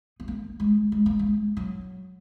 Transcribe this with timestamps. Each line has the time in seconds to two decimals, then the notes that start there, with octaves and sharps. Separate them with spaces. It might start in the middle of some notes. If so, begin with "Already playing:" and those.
0.20 B3
0.28 A#3
0.60 G#3
0.92 G#3
1.06 A#3
1.19 G#3
1.57 F#3